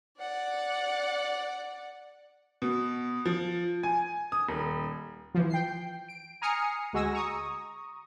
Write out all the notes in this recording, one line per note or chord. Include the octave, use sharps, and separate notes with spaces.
D5 F#5
B2
F3
G#5
D#6
D#1
E3 F3
G5 C7
D7
G#5 A#5 D#6 F6 C7 C#7
D2 G#3 F#4 G#5 E6 A#6
A#5 C#6 D#6